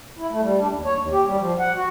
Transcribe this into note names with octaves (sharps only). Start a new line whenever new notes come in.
E4
A3
G3
D4
D#2
C#5
D#2
G4
G3
F3
F#5
F#4